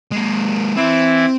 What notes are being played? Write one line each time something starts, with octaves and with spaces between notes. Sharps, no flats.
G#3 A#3
E3 C4 E4